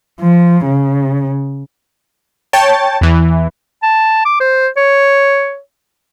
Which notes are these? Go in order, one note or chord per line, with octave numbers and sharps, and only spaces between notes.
F3
C#3
C#5 G5 A5
E2 E3
A5
D6
C5
C#5